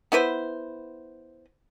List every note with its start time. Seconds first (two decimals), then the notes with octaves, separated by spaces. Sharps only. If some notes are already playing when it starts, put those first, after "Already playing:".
0.12 B3 E4 B4 C5